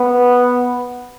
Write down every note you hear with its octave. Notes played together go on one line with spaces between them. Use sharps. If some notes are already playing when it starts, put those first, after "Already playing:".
Already playing: B3